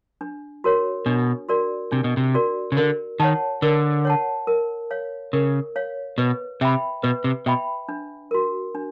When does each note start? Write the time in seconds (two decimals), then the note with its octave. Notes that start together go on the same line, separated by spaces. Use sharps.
0.21 D4
0.64 F#4 A#4 C#5
1.06 B2 D4
1.49 F#4 A#4 D5
1.92 C3 D4
2.04 B2
2.17 C3
2.34 F#4 A#4 D5
2.72 C#3
2.77 D3 A#4
3.20 D#3 C#5 F#5 A5
3.62 D3 A#4
4.05 C#5 F#5 A5
4.47 A#4
4.91 C#5 F5
5.33 C#3 A#4
5.76 C#5 F5
6.18 B2 B4
6.61 C3 E5 G5 B5
7.03 B2 B4
7.24 C3
7.46 B2 E5 G5 B5
7.89 D4
8.31 F#4 A#4
8.75 D4